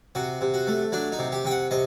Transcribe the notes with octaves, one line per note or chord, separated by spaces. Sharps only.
C3 F#4
C3
F#4
A3
F#3 D4
D#4
C3
G4
C3 G5
F#5
C3 D#5